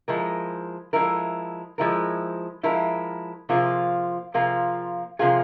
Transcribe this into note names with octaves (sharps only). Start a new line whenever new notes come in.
F3 G#3 E4 A#4
F3 G#3 E4 A#4
F3 G#3 E4 A#4
F3 G#3 E4 A#4
C3 F3 A#3 F4 G#4
C3 F3 A#3 F4 G#4
C3 F3 A#3 F4 G#4